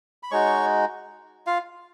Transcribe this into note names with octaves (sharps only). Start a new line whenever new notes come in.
B5
G#3 D#4 F#4 C#5 C#6
F4 F5